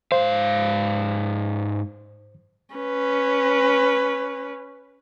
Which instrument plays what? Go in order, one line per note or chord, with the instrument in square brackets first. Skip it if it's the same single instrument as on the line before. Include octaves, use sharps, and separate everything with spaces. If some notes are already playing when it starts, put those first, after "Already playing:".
[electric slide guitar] G#2 F5 [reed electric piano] C5
[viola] C#4 B4